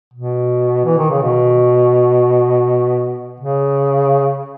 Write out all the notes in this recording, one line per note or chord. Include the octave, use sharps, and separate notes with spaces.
B2
E3
D#3
C#3
B2
C#3